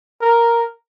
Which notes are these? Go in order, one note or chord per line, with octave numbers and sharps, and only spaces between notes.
A#4